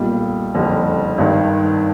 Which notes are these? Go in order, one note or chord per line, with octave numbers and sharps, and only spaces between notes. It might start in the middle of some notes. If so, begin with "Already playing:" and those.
Already playing: B1 A#2 G3
F#1 F2 D3 G3
G#1 G2 D#3